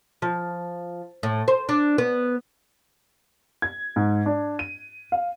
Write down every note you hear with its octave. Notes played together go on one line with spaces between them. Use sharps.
F3
A2
C5
D4
B3
G#6
G#2
D4
D#7
F5